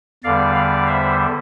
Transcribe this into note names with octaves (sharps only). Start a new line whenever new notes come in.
E2 D3 G3 D5 F5
D5 F5
C5 E5